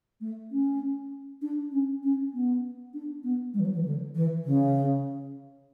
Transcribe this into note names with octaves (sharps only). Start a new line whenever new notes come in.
A3
C#4
D4
C#4
C#4
B3
D4
B3
G#3
E3
F#3
E3
D3
E3
C#3